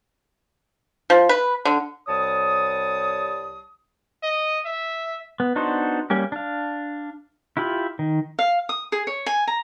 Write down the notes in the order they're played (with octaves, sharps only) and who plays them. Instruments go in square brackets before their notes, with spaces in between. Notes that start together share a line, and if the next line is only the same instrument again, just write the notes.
[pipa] F3
B4
D3
[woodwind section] C2 G3 C#5 A5 D#6
[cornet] D#5
E5
[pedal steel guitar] B3
B3 D4 D#4 F#4 C5
G3 A#3 C#4 G4
D4 F5
E4 F4 G4 B5
D#3
[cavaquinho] F5
D#6
G#4
C#5
G#5
A#5